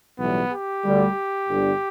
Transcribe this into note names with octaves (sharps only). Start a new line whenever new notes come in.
B1 A2 E3 G3 B3
G4
D2 D3 G3
G1 G2 D3 G3